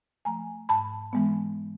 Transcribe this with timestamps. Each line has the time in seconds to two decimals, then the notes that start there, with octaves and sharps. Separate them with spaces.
0.25 F3 A3 G#5 A#5
0.69 G#2 A5 B5
1.13 E3 G#3 B3